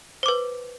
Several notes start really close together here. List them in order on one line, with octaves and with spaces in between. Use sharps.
C5 D6 B4